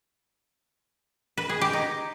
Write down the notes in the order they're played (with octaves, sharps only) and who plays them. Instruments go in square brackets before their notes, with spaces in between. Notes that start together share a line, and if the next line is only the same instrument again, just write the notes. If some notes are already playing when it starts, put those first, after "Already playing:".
[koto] B4
G#4
G4
D#4